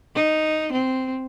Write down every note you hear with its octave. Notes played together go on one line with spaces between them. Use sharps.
D#4
C4